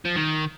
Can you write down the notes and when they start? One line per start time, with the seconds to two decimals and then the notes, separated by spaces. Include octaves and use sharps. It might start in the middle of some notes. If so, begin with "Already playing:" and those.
0.05 F3
0.16 D#3